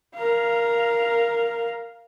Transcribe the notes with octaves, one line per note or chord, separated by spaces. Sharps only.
A#4 F5